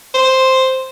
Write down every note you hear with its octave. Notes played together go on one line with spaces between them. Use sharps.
C5